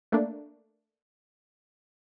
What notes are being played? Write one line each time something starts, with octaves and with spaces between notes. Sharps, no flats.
A3 A#3 D4